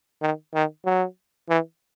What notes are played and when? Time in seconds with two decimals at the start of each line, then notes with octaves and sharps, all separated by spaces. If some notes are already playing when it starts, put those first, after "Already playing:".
0.22 D#3
0.54 D#3
0.85 F#3
1.49 E3